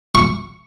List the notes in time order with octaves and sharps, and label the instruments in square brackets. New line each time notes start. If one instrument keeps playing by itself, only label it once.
[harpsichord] C#6